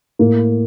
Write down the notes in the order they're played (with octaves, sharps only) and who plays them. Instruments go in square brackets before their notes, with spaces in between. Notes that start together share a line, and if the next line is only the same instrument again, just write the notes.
[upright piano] A2 A#3